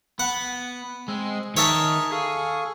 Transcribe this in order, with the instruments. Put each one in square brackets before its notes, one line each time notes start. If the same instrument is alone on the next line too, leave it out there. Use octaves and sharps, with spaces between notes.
[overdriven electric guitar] B3 [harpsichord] F#5
[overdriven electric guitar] G#3 [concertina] C4 E6
[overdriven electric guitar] D#3 [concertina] G#4 A#4 [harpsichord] C#5 E5 A5
[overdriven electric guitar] G#4 [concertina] A4 F5 C#6